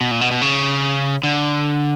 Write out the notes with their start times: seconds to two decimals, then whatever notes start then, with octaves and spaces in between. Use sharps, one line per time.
0.01 B2
0.11 A#2
0.21 B2
0.31 B2
0.42 C#3
1.23 D3